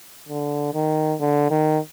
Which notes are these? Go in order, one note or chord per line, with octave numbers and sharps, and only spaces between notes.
D3
D#3
D3
D#3